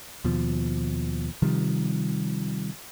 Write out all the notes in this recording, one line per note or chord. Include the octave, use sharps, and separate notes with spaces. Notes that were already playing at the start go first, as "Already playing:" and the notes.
D#2 B2 F3
C3 D#3 F3 G3